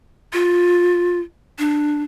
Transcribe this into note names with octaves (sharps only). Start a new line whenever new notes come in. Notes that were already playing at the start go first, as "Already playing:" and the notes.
F4
D4